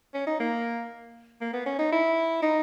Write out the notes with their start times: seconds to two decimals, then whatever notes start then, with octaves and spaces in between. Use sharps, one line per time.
0.14 C#4
0.27 D#4
0.40 A#3
1.41 A#3
1.53 B3
1.66 C#4
1.79 D#4
1.92 E4
2.42 D#4